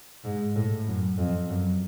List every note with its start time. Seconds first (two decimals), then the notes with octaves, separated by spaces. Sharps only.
0.24 G#2
0.55 A2
0.87 F#2
1.18 F2
1.49 F#2